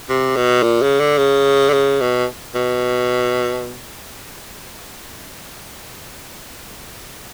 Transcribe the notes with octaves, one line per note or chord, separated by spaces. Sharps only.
C3
B2
A#2
C#3
D3
C#3
D3
C#3
B2
B2